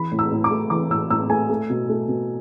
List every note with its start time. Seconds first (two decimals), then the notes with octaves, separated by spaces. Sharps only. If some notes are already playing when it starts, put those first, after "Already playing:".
Already playing: E3 B5
0.12 A2
0.19 E6
0.32 A2
0.44 D6
0.51 A3
0.70 E3 D6
0.90 A2 E6
1.10 A2 E6
1.29 A3 G#5
1.50 A3
1.70 B2
1.89 A3
2.08 B2